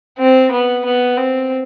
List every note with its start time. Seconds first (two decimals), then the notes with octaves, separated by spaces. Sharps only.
0.19 C4
0.51 B3
0.85 B3
1.17 C4